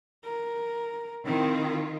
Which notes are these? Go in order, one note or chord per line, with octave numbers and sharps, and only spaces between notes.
A#4
D#3 C4 E4 F4